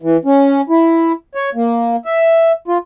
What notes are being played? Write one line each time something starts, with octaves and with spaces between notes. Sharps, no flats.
E3
C#4
E4
C#5
A#3
E5
F4